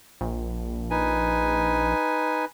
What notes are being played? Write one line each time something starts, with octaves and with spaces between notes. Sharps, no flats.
A#1
D#4 B4 G#5